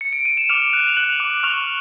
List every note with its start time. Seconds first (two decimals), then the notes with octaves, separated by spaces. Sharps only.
0.01 C#7
0.13 D7
0.25 D#7
0.37 E7
0.49 D6 F6 F7
0.73 F#6
0.88 F7
0.96 F#6 F#7
1.20 D6
1.43 C#6 F6 F7